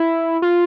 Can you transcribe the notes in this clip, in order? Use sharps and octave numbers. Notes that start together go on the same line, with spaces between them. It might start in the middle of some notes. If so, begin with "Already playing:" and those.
Already playing: E4
F4